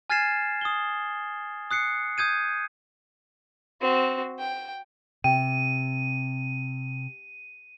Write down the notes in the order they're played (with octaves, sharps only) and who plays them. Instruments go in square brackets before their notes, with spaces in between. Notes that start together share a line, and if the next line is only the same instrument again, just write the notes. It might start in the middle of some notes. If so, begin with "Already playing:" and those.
[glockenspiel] G#5 F6 G#6 A6 C7 E7
D#6 G7
D#6 F#6 C7 C#7
D#6 G6 G#6 D#7
[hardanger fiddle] C4 F#4
G5
[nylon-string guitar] C3 [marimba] G5 [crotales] D#7